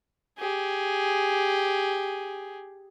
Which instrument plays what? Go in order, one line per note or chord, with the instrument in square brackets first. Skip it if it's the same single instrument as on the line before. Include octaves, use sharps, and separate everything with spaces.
[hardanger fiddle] G4 G#4